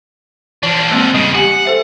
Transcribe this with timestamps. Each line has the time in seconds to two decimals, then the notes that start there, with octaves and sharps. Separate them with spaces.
0.63 E3 F3 D4
0.91 G#3 A#3 C4
1.14 E2 C#3 G3
1.34 G4 F#5 G#5
1.65 A4 C5 E5